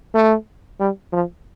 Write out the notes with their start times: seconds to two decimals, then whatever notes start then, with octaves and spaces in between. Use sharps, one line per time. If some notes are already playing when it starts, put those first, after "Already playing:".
0.15 A3
0.80 G3
1.13 F3